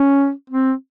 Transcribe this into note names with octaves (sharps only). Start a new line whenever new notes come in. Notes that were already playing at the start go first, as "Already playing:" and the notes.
Already playing: C#4
C4